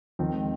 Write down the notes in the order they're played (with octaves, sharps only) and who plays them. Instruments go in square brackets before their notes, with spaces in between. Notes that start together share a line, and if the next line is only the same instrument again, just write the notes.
[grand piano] D#2 D#3 C4 [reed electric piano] F3
[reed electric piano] G#3